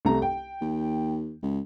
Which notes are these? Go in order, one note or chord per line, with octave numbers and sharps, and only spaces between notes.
C2 A3 A#5
G5
D#2
C#2